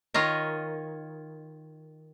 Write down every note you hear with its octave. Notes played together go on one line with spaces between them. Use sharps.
D#3 F4 C#5 D#5